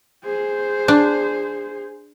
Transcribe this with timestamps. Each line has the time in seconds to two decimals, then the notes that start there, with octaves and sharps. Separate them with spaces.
0.24 G#4 C5
0.88 D4